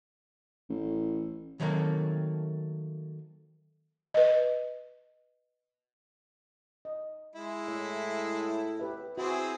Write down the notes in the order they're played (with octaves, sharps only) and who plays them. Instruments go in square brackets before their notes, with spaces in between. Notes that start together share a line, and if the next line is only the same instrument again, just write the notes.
[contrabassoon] A1
[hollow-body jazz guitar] D#3 F#3 G3 A3 A#3 C4
[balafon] B4 D#5
[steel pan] D#5
[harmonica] G#3 E4
[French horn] A2 [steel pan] E5
[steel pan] G4 B4 E5
[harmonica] C4 E4 G#4 [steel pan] F#4